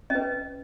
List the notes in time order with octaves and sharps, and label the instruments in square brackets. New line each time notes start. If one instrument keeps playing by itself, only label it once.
[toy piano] C#4 B4 D#5